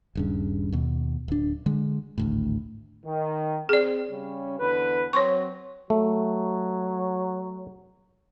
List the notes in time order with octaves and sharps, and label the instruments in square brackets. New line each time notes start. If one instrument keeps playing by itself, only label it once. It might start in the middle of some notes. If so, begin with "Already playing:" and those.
[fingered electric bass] D#1 G2 C#3
D#2 B2
D1 D4
D3 G#3
G#1 D2 A2
[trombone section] D#3
[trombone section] C4 [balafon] G#4 D5
[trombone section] C#3 G3 C#4
E2 D3 B4
[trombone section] F#3 C4 [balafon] C#5 C6 C#6
[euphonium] F#3 [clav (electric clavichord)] A3